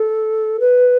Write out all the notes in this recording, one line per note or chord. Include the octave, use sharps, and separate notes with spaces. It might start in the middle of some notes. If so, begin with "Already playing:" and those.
Already playing: A4
B4